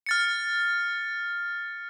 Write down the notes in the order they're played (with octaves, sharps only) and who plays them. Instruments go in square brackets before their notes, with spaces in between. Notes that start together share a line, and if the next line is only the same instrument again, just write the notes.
[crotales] F6 A6 C#7